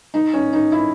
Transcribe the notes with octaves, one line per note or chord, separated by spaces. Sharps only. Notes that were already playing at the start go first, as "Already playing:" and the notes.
D#4
C#4
D#4
E4